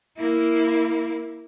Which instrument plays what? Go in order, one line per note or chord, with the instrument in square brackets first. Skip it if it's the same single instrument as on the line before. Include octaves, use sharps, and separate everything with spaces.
[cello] A#3 E4